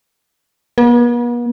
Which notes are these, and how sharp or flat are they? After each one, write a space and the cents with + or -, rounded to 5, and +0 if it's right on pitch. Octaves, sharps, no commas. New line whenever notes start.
B3 -45